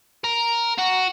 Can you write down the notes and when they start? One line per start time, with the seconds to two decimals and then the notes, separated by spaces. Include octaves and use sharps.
0.24 A#4
0.78 F#4